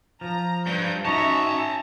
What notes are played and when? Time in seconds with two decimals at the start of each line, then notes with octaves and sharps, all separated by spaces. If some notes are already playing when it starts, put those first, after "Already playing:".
0.21 F3 A#5
0.66 G2 G6
1.05 C#4 D#4 F#4 C#5 E5 A5 A#5